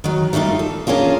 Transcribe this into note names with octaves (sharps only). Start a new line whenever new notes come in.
D#3 F#3
G3 A3 A#3 D#4 F4
A4
A#3 C#4 D4 F4 G#4